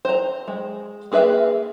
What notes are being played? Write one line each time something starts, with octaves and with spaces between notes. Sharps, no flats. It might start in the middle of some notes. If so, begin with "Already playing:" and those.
C5 A#5
G#3
A#3 G#4 B4 E5 F5